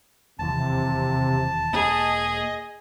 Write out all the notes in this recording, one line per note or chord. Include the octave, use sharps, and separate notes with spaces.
E1 D#2 C3 E3 A5
E1 A#3 G#4 D#5